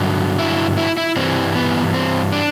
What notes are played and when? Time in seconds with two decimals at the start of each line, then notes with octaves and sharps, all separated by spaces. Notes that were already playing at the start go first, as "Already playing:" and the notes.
Already playing: G2 D3 F#3
0.39 E4
0.78 E4
0.97 E4
1.16 G2 E3 G3 C4
1.55 B3
1.94 C4
2.32 D4